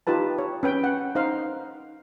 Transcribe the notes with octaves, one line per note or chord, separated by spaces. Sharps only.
D#4 F4 G4 B4 A5
C#5
C#4 B4 G5
F#5
D#4 C5 F5